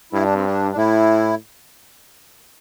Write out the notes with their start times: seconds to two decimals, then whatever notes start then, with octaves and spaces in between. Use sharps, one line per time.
0.13 G2 E4
0.23 D4
0.34 C4
0.45 D4
0.72 D4
0.77 A2 E4